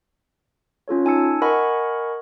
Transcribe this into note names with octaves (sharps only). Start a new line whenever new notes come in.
C#4 F4 A4 C#5
D#4 G#5 A5 E6 C#7
A#4 D#5 F#5 G#5 B5 C#6